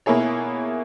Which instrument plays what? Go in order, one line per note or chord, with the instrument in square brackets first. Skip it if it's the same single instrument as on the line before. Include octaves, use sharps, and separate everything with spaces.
[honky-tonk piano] B2 A#3 E4 G#4 C#5